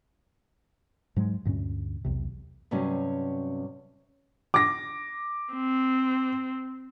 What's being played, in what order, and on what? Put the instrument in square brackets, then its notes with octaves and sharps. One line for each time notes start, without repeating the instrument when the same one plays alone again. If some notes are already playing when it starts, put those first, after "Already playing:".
[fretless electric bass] G#2 F#3 G#3
D2 G2 A#2 C#4
B1 E2 C3
[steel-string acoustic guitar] G2 C3 F#3 C#4
[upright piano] D6 A#6
[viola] C4